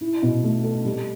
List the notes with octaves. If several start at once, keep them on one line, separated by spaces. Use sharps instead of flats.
E4
B2
A3
A4
G3